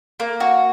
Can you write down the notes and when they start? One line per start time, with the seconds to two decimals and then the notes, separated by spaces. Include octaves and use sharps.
0.20 A#3
0.40 F#4